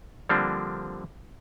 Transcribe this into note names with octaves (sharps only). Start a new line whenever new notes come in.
D3 F3 G3 A#3 C4 D4